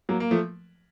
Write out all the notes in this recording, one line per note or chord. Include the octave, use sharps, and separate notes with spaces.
F#3 A#3
A#3
F3 A3